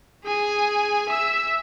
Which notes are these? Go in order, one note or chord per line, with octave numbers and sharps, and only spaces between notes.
G#4 G#5
E5 E6